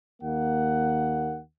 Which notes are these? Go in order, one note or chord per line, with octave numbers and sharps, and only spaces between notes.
D#2 A#3 F#5